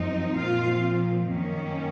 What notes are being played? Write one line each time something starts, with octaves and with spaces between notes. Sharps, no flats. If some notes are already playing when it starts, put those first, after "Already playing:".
Already playing: F#2 F3 C4 D#4
A#2 F3 C4 F4 F5
F#2 D#3 A#3 C#4